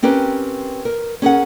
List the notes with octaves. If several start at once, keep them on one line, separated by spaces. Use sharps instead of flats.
C4 C#4 G4 A#4 B4
A#4
C#4 G#4 A#4 F#5